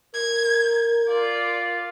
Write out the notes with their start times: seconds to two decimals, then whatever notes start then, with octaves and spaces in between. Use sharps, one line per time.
0.14 A#4 G#6
1.08 F4 D5